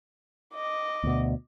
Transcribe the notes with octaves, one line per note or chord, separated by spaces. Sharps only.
D#5 D6
D2 B2